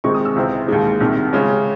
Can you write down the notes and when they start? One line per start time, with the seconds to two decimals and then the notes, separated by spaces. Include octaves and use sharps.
0.04 C3 D#3 G#3 C4 D#4 C#6
0.15 D#6
0.25 E6
0.36 C#2 C3 E3 C4
0.68 D#2 D#3 G#3
1.01 C2 C3 D#3
1.33 C#3 G#3 C#4